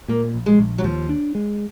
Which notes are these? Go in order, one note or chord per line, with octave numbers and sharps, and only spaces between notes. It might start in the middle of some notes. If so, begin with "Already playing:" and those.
A#2 A#3
A#1
G#3
A#1
F#3
D#2 F3
D4
G#3